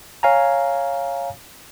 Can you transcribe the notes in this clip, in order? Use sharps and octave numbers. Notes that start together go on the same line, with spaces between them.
C#5 F5 G#5 A#5